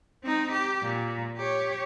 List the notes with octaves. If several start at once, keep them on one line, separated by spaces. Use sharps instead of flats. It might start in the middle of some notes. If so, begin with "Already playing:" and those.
C4 D#4
G4
A#2
G4 C#5